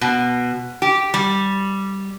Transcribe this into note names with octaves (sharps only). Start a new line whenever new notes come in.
B2
G4
G3